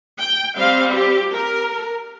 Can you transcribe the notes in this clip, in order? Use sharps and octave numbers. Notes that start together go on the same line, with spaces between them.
G5
G3 C4 F5
G4
A#4